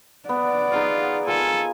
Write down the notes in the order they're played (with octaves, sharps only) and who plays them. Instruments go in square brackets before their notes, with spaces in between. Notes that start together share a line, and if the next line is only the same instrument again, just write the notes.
[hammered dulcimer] B3 [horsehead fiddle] D5 F#5
[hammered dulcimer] D#4 G#4 F5 [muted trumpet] F4
[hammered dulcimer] F4 A#4 F5 [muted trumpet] A4 [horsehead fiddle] G#5